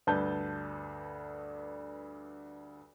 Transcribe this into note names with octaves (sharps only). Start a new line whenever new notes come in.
D2 G2 B4 A5 G6